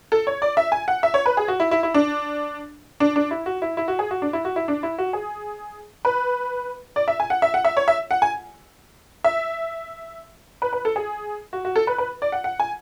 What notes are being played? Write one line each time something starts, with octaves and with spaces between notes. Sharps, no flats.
A4
C#5
D5
E5
G#5
F#5
E5
C#5
B4
G#4
F#4
E4
E4
E4
D4
D4
D4
E4
F#4
E4
E4
F#4
G#4
F#4
D4
E4
F#4
E4
D4
E4
F#4
G#4
B4
D5
E5
G#5
F#5
E5
F#5
E5
C#5
E5
F#5
G#5
E5
B4
B4
A4
G#4
F#4
F#4
A4
B4
B4
D5
F#5
F#5
G#5